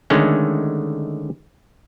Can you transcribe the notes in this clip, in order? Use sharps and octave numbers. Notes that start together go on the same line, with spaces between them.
D3 D#3 G#3 A3 C#4